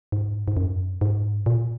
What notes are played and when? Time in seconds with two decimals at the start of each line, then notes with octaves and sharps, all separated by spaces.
0.12 G#2
0.48 G#2
0.57 F#2
1.01 G#2
1.46 A#2